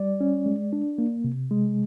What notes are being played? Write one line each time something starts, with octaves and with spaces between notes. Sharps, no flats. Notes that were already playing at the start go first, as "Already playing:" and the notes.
Already playing: G3 D5
C#4
G#3
D4
A#3
C3
G#3